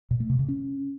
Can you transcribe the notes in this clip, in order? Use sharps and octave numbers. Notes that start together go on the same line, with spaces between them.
A#2
A3
C3
C#3
C#4